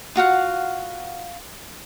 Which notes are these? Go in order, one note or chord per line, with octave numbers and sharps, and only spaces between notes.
F4 F#4 F5 F#5